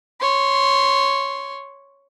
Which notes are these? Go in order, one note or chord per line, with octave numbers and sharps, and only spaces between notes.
C#5 C6